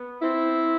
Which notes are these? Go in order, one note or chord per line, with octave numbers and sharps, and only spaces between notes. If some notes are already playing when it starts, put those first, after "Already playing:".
Already playing: B3
C4 E4